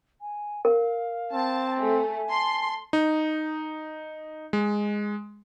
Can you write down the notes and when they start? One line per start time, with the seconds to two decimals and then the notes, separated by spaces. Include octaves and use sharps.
0.21 G#5
0.65 A#4 F5
1.33 C4 A5
1.79 A3 G#5
2.31 A5 C6
2.93 D#4
4.53 G#3